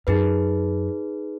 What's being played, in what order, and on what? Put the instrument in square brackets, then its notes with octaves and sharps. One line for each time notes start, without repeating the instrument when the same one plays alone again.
[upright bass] F#2 [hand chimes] D#4 G#4 B4